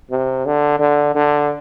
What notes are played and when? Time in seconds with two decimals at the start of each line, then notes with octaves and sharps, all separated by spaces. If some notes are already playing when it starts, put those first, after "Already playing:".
0.11 C3
0.46 D3
0.80 D3
1.15 D3